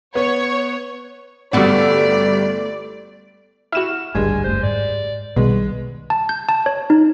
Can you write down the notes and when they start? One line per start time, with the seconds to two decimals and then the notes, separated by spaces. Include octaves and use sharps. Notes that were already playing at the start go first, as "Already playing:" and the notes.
0.15 B3 C#5
1.53 G1 G3 A3 B3 F#4 D5
3.72 E4 F#4 F6 E7
4.15 G#1 D2 G2 G3 G#3 G#5
4.44 F#1 A3 C5
4.63 G#2 D5
5.36 B1 B2 D#3 G3 G#3 B4
6.10 A5
6.29 G6
6.49 A5
6.66 C#5
6.90 D#4